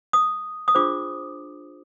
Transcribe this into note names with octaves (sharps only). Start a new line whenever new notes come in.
D#6
D#6
D4 F4 G#4 C5 D6